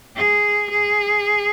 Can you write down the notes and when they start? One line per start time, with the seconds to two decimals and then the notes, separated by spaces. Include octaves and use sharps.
0.17 G#4
0.71 G#4